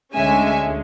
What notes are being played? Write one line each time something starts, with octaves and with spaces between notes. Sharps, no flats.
D2 D3 G#3 C#4 E5 G#5